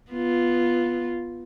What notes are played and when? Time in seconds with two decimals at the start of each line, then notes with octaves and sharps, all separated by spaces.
0.12 B3 F4